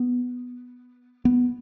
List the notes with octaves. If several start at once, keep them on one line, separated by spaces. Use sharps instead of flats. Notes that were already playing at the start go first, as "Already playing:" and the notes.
Already playing: B3
B3